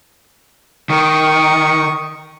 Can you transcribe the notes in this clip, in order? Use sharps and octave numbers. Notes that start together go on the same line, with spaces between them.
D#3 C#6 D#6